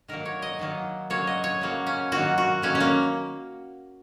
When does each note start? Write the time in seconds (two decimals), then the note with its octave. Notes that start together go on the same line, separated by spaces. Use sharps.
0.08 D#3 F#3 A#3 A#4
0.25 C#5
0.42 D#5
0.59 D#3 F#3 A#3
1.10 C#3 F#3 A#3 C#5
1.27 D#5
1.44 C#5
1.61 C#3 F#3 A#3
1.87 C#4
2.12 D#3 F#3 A#3 F#4
2.38 F#4
2.62 D#3 F#3 A#3 C#4
2.75 C#4
2.80 A#3